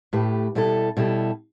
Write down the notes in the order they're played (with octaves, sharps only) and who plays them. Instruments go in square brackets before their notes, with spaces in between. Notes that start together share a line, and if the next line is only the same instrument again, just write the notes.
[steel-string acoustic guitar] A2 A3 G4 B4
B2 G3 E4 A4
B2 G3 E4 A4